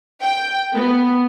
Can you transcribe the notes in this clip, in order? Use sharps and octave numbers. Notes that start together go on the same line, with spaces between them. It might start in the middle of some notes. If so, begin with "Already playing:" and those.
G5
B3